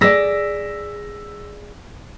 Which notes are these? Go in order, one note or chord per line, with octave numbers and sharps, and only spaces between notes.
G#4 D5 E6 A#6 B6